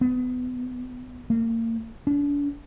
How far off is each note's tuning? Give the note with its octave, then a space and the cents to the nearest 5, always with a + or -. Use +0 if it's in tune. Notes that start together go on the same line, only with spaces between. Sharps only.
B3 +25
A#3 -35
D4 -35